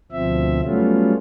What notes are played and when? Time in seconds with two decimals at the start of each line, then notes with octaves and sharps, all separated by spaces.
0.12 D2 B2 F3 C4 E5
0.64 F#3 G3 A3 B3 C#4 F4